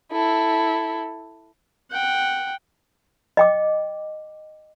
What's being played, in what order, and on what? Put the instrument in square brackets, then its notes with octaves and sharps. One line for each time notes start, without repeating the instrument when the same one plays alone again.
[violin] E4 A4
[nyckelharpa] F#5 G5
[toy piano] D#5 G5 D6